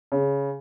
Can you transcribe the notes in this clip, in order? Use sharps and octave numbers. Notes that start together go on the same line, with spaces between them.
C#3